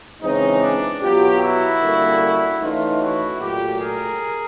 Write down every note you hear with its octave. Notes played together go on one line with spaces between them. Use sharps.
C#3 E3 G#3 C4 C#4 D#4
D4
B2 F#3 B3 F4 G4
E4 F#4
D3 G3 A#3 C#4
E3 A3 C#4 D#4 F4
E4 F#4
A#2 F#3 A3 F4 G4
G#4 A#4